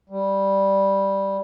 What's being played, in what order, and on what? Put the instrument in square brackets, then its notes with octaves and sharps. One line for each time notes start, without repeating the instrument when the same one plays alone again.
[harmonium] G3